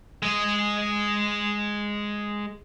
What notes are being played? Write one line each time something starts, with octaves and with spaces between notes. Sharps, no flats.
G#3 D#5